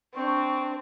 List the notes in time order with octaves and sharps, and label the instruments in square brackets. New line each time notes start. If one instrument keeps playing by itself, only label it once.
[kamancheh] C4 [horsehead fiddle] D4 [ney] C#6